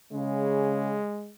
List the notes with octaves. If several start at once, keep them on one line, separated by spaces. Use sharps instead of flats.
C#3 G#3